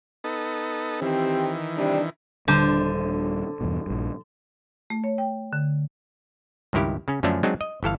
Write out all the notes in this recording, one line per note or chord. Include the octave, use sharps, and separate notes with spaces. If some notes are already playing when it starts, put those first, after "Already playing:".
B3 D#4 A4
D#3 E3 C4 G4
C3 G3 D4
D#1 D3 G3 D4 C5 A5
E2 G2 B2
A#1 G2
A3
C#5
G5
D3
C#2 G2 D#3 E4 G4
C#3 C#4
F#2 D3 F3 A3 C#4 D4
F#3 G#3 C4 D4 D#4
D#5
G1 E3 A4 F5